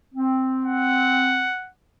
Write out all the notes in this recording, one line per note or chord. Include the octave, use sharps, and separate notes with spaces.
C4
F#5